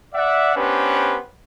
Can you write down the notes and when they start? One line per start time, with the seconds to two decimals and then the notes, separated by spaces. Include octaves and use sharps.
0.14 D5 E5 F#5
0.56 B3 C#4 D4 G4 B4 C5